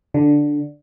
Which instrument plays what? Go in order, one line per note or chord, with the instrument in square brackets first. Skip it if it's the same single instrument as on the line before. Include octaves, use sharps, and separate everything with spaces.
[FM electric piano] D3